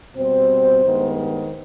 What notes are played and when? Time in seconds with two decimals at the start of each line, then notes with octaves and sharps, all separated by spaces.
0.15 B2 G3 C4 C5
0.84 G2 D#3 G#3 B3